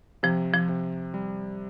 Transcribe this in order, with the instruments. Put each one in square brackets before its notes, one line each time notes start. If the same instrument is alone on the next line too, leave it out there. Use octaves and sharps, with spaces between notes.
[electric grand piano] C3 [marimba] F3
[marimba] F3
[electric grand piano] C3
G3